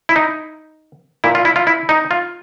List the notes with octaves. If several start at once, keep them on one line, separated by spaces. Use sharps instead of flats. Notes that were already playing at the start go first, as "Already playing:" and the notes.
E4
D#4
A#2 E4
F4
E4
F4
E4
D#4
F4